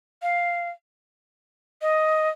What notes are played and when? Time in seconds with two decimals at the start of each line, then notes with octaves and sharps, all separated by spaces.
0.22 F5
1.82 D#5